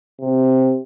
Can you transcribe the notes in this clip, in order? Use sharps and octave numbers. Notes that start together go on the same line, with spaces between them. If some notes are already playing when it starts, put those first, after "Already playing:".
C3